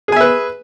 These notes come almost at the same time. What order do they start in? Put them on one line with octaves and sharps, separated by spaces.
G#4 G#5 E5 B4